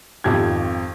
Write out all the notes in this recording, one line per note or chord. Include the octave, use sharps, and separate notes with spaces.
G#1 F2 G4 G#6